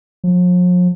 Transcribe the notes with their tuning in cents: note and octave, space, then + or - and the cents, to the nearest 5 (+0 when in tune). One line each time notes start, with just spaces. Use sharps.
F3 +45